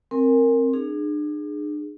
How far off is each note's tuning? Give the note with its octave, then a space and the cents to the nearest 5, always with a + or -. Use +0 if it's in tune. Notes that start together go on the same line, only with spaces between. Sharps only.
C4 +15 A#4 -10 G#5 -20
D4 +40 G#4 +0